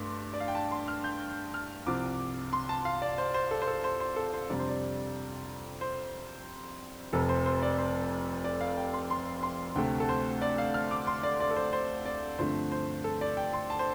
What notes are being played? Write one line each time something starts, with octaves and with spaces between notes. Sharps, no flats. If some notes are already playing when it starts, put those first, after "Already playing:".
Already playing: G2 A3 C6 D6
D5
F5
G5
A5
C6
F6
G6
F6
C2 C3 F3 D6
C6
A5
F5
D5
C5
C5
A4
C5
A4
C5
C5
A4
C5
F2 C3 G3 D4 D5
C5
D5
C5
F1 F2 C3 A4
C5
C5
D5
C5
D5
F5
G5
C6
C6
C6
D2 C3 A3 G5
A4
C5
D5
F5
F6
D6
C6
D5
D5
A4
C5
C5
D5
G2 D3 F3 A3 C4 C5
C5
A4
D5
G5
C6
A5
C5